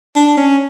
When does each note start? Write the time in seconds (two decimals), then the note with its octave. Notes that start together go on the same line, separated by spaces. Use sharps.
0.16 D4
0.38 C#4